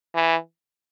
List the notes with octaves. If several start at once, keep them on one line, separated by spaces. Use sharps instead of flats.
E3